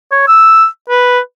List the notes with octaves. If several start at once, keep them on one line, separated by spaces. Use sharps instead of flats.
C#5
E6
B4